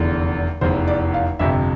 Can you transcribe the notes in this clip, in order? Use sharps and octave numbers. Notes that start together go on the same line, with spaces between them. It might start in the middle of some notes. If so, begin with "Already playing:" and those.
Already playing: F1 E2 D3
F1 E2 E3 C5
D5
F5
G1 F2 C3 E5